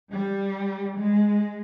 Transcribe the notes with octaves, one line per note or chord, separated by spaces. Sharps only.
G3
G#3